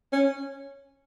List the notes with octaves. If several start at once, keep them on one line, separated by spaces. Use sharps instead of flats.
C#4